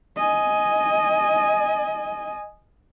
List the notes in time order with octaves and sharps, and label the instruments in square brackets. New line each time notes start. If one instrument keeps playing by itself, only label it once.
[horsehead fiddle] D#5 G#5